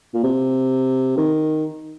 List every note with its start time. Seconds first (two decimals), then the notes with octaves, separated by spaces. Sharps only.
0.14 A#2
0.23 C3
1.17 D#3